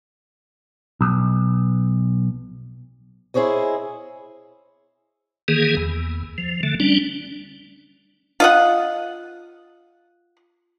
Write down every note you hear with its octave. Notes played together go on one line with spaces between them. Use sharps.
B1
E4 G#4 C5 C#5 D#5
D#3 E3 A#3 G#4
E2
F3
D3 A3
G3 C#4 D4
F4 D#5 F#5